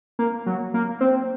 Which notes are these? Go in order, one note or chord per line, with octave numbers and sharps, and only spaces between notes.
A#3
F#3
A#3
C4